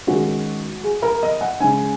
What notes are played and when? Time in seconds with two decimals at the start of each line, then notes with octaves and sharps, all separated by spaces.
0.07 D#3 G#3 C#4 F#4
0.83 G#4
1.02 A#4
1.23 D#5
1.41 F#5
1.60 C#3 G#3 C#4 G#5